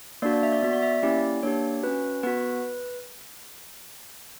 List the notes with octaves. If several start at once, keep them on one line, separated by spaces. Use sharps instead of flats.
A#3 D4 F#4 D5
D5
E5
D5
B3 F#4 E5
D5
E5
D5
A#3 C#4 E4 G4 D5
A#3 D4 G4 C#5
C#4 F#4 B4
B3 F#4 B4